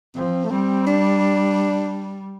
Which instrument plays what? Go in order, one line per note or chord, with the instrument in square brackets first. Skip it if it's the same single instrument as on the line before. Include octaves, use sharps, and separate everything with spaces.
[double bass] F3 [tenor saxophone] C4
[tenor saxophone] A3
[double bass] G3 [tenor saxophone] C4
[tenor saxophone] D4